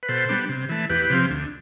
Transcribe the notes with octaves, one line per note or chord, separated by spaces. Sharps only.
B4
B2 A4 C5
G3 B3 D4
C3
E3 A3
E2 G4 B4
C3 F3 C4
D2